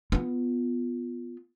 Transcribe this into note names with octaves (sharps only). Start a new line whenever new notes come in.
B3 F4